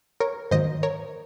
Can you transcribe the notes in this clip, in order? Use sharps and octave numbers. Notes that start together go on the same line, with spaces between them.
A#4 C#5
G#2 D#3 F#3 A#3 C5 D#5
A#4 C#5